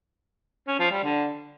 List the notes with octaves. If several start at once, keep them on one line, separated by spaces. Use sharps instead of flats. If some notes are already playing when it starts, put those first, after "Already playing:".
C#4
F3
G3
D3